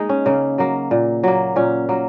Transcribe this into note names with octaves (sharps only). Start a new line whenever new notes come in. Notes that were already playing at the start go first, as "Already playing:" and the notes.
Already playing: G#3 A#3 D#4 G#4
C#4
C#3 A#3
F#3 A#3
A#2
F#3 A#3
A#2 C#4
F#3 A#3